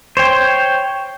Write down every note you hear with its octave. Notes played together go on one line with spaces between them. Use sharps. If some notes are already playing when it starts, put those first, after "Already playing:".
C5 C#5 G5